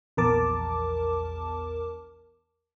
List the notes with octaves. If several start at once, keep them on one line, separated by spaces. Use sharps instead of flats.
A#1 E2 A#4 A5 D6